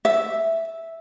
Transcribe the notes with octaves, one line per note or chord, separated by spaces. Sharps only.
E5